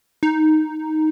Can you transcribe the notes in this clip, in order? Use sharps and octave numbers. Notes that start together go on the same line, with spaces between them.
D#4